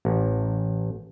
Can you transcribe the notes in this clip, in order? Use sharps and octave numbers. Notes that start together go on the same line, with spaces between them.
A1